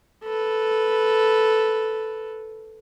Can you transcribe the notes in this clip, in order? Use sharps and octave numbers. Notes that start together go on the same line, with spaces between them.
A4 B4